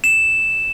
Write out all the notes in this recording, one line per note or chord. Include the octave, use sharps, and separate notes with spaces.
E7